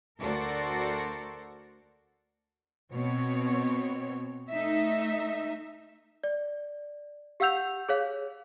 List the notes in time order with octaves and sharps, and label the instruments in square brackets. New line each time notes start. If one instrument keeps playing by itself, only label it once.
[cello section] D2 F#4 A4 A#4 C5 D5
B2 C4 C#5
A3 D#4 E5
[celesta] D5
G4 F5 F#5 E6 G6 F7
G#4 C#5 F5